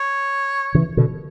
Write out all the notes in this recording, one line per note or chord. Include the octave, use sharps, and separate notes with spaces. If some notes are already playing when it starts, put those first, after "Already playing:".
Already playing: C#5
C#3 E3
B2 D3